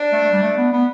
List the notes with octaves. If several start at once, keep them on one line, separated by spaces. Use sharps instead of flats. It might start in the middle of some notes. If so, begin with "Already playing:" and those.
Already playing: D4
A3
A3
G3
A3
B3
B3